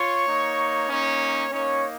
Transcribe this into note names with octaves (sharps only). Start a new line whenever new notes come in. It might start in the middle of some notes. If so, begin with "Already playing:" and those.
Already playing: F4 C#5 C#6
A#3 D#4
A#3 C#4 D#4 C#5
A#3 C#4 D#4 C#5